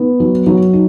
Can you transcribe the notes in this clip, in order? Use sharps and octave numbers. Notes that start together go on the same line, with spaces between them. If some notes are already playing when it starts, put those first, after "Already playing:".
Already playing: B3 D#4
F#3
F#3
D#4